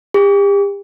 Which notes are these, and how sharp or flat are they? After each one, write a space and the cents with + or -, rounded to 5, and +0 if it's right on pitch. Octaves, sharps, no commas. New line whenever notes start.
G4 +40